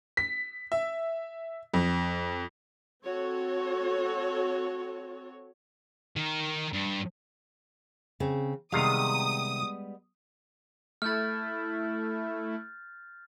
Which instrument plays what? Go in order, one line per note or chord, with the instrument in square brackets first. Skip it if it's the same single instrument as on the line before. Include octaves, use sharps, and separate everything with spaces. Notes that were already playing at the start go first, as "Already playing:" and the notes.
[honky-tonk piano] B6
E5
F2
[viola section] C4 F#4 A4 C#5
[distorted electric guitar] D#3 A#4
G2
[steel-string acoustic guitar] C#3 C4
[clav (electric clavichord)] C3 D#3 F5 [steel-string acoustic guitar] G3 G#3 B3 [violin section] D#6
[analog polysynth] A3 E4 [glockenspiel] F6 G6 A6